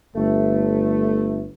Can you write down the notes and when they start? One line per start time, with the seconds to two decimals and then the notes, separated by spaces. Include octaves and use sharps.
0.16 G1 A3